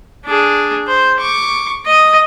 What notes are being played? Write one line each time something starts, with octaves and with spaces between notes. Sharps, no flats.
D4 G#4
C5
C#6 D6
D#5 D#6